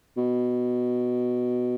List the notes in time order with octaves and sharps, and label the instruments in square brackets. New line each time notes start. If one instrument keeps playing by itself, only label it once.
[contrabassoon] B2